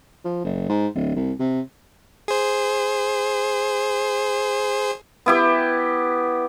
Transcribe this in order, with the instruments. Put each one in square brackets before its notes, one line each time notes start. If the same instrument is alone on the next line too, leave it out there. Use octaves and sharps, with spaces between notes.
[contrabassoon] F3
F#1
G#2
D1
C2
C3
[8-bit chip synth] G#4 C5
[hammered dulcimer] B3 E4 G4